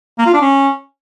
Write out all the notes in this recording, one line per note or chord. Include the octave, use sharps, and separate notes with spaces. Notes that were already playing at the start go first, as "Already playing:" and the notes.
A#3
F4
D4
C#4